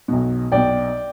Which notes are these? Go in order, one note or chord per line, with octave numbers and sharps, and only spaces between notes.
B1 B2
B1 B2 D5 G5